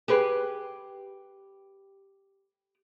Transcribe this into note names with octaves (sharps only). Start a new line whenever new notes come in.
G4 G#4 B4